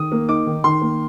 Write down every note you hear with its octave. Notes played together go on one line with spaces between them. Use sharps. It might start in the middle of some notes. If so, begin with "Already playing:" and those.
Already playing: D#3 D#6
A#3
D#4 D6
D#3
D#3 C6
A#3